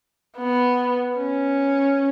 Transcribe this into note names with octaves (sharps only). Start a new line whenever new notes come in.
B3
C#4